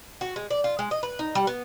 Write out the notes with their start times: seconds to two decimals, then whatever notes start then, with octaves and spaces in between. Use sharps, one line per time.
0.21 F#4
0.36 G#3
0.50 D5
0.64 F4
0.79 G#3
0.91 D#5
1.03 B4
1.19 D#4
1.35 G3
1.47 B3